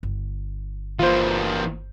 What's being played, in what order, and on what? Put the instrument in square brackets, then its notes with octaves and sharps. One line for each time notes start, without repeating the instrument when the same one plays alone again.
[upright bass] G1
[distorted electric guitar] E3 A#3 [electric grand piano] F4 C5